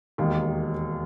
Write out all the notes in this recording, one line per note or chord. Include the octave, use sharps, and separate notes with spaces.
E1 D#2 D#3